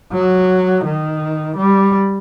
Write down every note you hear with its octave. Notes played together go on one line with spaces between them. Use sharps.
F#3
D#3
G3